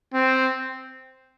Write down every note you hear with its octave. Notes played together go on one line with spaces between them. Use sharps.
C4